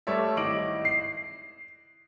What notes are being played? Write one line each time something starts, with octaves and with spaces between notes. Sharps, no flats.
G3 A3 C#5 D5 E5
G#1 E4 D#5 D6 D7 F#7
C7